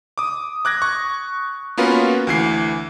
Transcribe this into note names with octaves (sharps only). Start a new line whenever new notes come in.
D6 D#6
D6 F#6 G#6 A#6
C#6
A#3 B3 C#4 F4 F#4 B4
D2 E3 C7